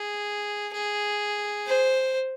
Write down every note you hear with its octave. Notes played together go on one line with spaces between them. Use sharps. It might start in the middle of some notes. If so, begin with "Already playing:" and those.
Already playing: G#4
G#4
C5